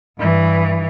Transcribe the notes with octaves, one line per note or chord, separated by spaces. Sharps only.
G2 E3